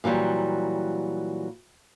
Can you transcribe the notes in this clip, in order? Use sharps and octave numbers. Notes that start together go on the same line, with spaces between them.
A#2 E3 F#3 G3